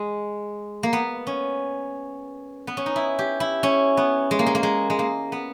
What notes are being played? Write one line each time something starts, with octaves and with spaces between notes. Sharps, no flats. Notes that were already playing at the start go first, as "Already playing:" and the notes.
Already playing: G#3
A#3
B3
C#4
B3
C#4
D#4
E4
G4
E4
C#4
B3
G#3
A#3
G#3
A#3
G#3
G#3
A#3
B3